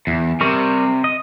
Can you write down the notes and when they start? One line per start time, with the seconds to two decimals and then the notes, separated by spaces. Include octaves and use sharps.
0.07 E2
0.41 C3 G3 A#4 C#6
1.04 D#5